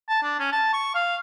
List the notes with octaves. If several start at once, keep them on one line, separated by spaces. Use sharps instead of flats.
A5
D4
C#4
A5
C#6
F5